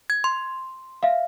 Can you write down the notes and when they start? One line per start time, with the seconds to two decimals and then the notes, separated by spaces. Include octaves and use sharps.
0.10 G#6
0.24 C6
1.03 E5 F5